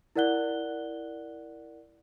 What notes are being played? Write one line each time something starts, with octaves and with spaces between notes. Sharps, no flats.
E4 A#4 D5 F#5 F#6 G7